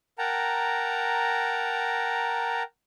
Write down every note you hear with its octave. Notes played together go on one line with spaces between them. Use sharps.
A#4 F#5 G5 A5 A#5